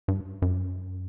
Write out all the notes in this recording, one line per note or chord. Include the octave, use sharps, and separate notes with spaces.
G2
F#2